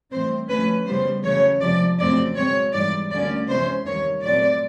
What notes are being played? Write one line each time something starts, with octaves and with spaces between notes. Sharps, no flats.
A2 E3 G3 C4 C5
D2 D3 F3 A3 C#4 B4
C#3 E3 G3 B3 C5
E2 C#3 F#3 A3 C#5
C3 F3 G#3 D5
F2 C#3 F#3 A3 C4 D5
B2 G#3 C4 C#5
G#2 E3 G3 D5
D2 D3 G3 A#3 C#4 D5
C3 E3 G#3 C#4 C5
D#2 D#3 G3 C#5
A#2 F#3 A3 C4 D5